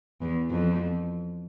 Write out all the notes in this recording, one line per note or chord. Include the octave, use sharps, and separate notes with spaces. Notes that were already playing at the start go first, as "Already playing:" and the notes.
E2
F2